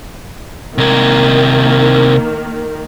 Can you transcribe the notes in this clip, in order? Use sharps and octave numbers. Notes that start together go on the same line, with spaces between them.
C3 D#3 A#3 A#4